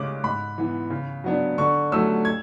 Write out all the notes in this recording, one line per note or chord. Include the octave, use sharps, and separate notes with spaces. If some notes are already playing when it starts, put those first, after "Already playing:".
Already playing: C#3 G#3 C#4 D6 F#6
G#2 B5
E3 B3
C#3
F#3 B3 D4
D3 C#6
F#3 A3 C#4 E6
G#6